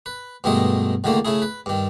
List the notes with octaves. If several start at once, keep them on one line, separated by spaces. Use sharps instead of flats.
B4
G2 B2 D#3 G#3 A3 D#5
C#2 D3 D#3 A3 A#3
C#3 A3 E4 G#4
B4
G2 D#3